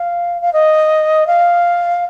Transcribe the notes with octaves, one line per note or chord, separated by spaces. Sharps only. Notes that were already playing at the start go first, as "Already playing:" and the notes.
Already playing: F5
F5
D#5
F5